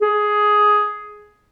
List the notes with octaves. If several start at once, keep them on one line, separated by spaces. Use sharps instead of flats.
G#4